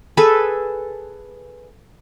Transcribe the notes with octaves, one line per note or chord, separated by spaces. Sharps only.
G#4 A4 B4